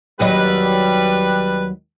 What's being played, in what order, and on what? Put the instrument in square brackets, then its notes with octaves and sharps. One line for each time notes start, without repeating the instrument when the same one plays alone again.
[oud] D#2 F#3 D#5 [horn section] G3 B4